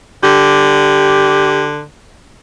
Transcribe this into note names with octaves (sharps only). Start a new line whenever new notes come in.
D3 G4